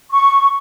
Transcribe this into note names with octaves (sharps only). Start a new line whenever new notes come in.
C#6